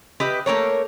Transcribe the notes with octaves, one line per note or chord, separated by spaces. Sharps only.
G4 B4 D#5 E5
A3 A#3 A#4 C#5